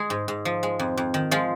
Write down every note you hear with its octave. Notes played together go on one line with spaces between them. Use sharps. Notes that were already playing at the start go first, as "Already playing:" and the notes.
Already playing: G#3 G#4
G#2
G#2
F3
G#3
F2
F2
D#3
F3 G#3 F4